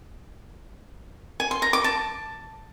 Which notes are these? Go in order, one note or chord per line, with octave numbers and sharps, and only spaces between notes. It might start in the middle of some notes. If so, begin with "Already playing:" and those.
G#5
C6
A#5
D6
A5